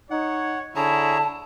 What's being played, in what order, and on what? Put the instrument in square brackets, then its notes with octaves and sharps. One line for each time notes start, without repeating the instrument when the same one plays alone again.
[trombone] D#4 [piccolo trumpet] C#5 [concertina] F#5
[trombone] D3 [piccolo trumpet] E4 [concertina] G#4 C#5 A#5 [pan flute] A5